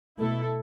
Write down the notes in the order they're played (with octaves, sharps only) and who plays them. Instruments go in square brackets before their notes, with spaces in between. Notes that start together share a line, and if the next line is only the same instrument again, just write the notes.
[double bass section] B2 A3 [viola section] E4 A4